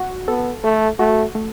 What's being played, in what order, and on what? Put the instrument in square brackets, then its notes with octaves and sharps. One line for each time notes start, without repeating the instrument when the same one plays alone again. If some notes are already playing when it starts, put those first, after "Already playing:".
Already playing: [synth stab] F#4
[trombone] B3 [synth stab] A4
[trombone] A3 [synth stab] A4
[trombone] A3 [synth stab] F#4
[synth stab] A3